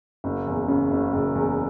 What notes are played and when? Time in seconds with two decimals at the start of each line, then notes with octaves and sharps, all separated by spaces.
0.24 F#1
0.47 E2
0.68 C#3
0.91 F#1
1.13 F#1
1.35 E2